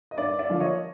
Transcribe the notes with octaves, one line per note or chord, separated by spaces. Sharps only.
D#5
G2 D5 E5
D5 E5
D3 F3 A#3
C#5 D#5